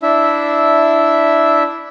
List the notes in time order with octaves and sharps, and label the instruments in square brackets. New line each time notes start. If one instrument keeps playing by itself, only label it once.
[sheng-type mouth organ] D4 E4 E5